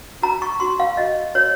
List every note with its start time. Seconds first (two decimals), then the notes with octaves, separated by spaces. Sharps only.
0.22 F#4 A#5
0.42 C#6
0.60 F#4 C6
0.80 F5
0.97 F#4 D#5
1.35 F#4 C#5